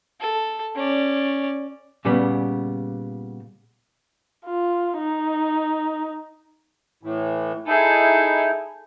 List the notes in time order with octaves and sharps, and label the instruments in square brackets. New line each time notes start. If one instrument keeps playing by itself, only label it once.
[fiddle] A4
C#4 D5
[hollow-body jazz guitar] A#2 C#3 G3 B3
[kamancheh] F4
D#4
[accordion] A2 E3
[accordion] D#4 E4 [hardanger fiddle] G#4 A4